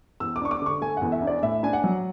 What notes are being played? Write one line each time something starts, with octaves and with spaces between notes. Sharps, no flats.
E2 E6
D6
D4 C#6
D6
D3 C#6
A3 G#5
E2 F#5
E5
D4
D5
A2 E5
D4 G#5
F#5
F#3